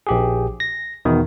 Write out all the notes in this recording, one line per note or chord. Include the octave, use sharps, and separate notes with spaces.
A#1 G4 G#4
A#6
E2 B2 D#3